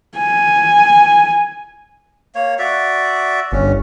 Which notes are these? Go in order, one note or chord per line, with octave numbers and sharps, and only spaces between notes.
G#5
A#3 C#5
F#4 D5 E5
G1 C#4